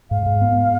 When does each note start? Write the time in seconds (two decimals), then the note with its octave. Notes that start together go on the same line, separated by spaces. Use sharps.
0.10 G#2 F5
0.26 G#2
0.41 B3